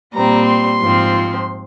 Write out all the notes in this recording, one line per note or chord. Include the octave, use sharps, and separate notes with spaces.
A#2 G3 C4 A#5
C6
G#2 F3 C4